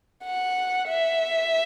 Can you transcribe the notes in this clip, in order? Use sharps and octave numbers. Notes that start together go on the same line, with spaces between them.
F#5
E5